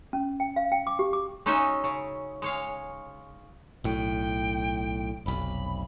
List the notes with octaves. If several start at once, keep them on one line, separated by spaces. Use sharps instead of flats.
C#4
G5
F5
G5
D6
G4
D6
G#3 C#4 D#4 F#4 D#5 E5
C#3
G#3 C#5 F5
B1 A2 G5
F1 B1 B5